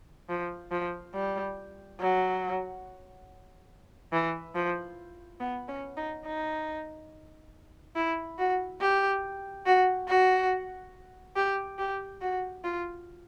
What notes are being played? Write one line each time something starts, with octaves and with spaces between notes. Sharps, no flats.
F3
F3
G3
F#3
E3
F3
B3
C#4
D#4
D#4
E4
F#4
G4
F#4
F#4
G4
G4
F#4
F4